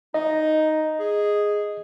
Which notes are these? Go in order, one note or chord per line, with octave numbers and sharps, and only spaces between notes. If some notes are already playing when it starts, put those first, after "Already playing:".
D#4 D#5
G#4